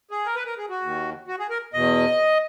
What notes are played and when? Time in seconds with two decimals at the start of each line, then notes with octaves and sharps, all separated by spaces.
0.11 G#4
0.26 A#4
0.35 B4
0.46 A#4
0.58 G#4
0.69 F#4
0.82 D#2 D#3
1.28 F#4
1.39 G#4
1.50 A#4
1.73 E2 B2 D#5